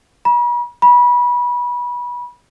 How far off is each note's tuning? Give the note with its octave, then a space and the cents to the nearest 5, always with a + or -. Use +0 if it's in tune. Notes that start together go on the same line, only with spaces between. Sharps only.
B5 -45
B5 -25